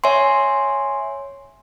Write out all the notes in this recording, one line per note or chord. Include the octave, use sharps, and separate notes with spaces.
C#5 E5 G#5 C6